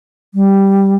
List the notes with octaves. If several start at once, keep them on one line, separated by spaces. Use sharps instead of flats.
G3